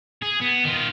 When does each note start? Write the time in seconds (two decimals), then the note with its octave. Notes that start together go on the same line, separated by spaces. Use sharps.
0.22 G#4
0.41 B3
0.64 D#3 F4